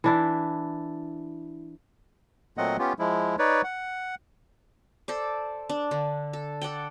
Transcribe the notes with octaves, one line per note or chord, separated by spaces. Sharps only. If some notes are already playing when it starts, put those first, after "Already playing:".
E3 D4 E4
A#2 F#3 A3 C4 D#5 F#5
B3 C#4 F4 G4
F3 G#3 E4
D#4 B4 C#5 D5
F#5
A4 C5 D5
D4
D3
A4
A4 D5 F#5 G5